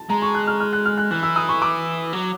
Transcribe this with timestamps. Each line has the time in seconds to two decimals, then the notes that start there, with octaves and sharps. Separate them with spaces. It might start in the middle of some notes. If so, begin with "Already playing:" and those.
Already playing: A5
0.10 G#3 A#5
0.22 C#6
0.34 F#6
0.47 F6
0.60 F6
0.73 F#6
0.85 F6
0.97 F#6
1.11 E3 F#6
1.23 E6
1.36 D#6
1.49 C#6
1.62 D6
2.13 F#3